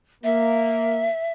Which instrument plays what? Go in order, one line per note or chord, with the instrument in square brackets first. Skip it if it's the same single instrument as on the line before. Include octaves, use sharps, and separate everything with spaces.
[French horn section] A#3 [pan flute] E5